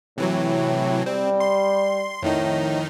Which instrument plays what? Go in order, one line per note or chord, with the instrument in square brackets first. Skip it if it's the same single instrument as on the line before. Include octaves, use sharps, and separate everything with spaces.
[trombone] A2 [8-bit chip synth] C3 E3 F#3
[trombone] G3 [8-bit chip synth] C4
[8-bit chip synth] C6
[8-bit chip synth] F2 D#3 D#4 [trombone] A2